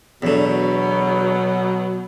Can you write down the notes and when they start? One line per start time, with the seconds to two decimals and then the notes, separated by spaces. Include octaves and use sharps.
0.22 E2 B2 D3 F#3